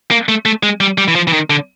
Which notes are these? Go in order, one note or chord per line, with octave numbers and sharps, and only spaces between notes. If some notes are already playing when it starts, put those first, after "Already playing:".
A#3
A3
A3
G#3
G3
G3
E3
F3
E3
D#3
D3